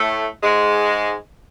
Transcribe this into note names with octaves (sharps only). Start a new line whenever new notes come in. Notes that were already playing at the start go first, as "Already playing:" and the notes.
Already playing: A2 A3
G#2 G#3